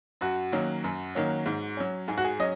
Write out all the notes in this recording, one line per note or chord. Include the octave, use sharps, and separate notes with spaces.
F#2 F#4
D#3 F#3 A#3 C#4
F#2
D#3 F#3 A#3 C#4
G#2
F#3 C#4
G#2 G#4
F#4
G#4
F#3 C#4 D#5